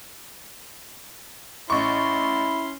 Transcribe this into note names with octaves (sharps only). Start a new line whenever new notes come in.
A1 C#4 E4 C6 C#6